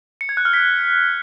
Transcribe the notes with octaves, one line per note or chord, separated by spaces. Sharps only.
C#7
G#6
F#6
F6
B6